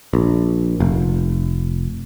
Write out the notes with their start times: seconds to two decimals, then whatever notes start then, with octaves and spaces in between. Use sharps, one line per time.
0.13 A#1
0.80 F1